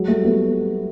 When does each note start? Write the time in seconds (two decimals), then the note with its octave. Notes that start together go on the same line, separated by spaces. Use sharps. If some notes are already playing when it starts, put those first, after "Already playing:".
Already playing: F#3 G#3
0.08 G3 A3
0.24 A3 B3